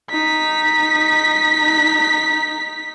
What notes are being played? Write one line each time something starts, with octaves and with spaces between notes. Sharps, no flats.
D#4 B6